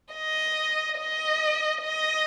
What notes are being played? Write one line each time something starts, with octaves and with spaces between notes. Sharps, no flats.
D#5
D#5
D#5